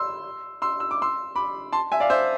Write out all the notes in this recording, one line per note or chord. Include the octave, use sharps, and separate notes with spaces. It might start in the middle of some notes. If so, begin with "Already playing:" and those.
Already playing: C6 E6
C6 E6
E6
D6
C6 E6
B5 D6
A5 C6
E5 G#5
D5 F5
C5 E5